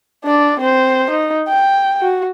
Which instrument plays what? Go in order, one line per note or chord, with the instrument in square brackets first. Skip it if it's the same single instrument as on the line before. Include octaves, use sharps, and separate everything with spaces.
[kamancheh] D4 D5
C4 C5
D#4
G5
F#4